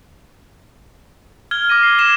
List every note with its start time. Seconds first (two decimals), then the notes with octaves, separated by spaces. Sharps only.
1.51 F6 G#6 G7
1.69 D6 F6 A#6 D#7
1.83 C7
1.99 G#6 A#6 E7 G7